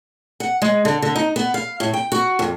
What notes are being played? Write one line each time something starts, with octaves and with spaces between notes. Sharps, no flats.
F#5
G#3
D3
D3
D#4
B3
F5
A2
G5
F#4
F2